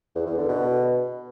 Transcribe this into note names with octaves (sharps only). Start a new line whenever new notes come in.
E2
E2
D3
B2